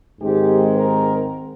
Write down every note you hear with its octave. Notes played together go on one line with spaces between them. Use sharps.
G#2 D#3 G#3 C4 G4
A#4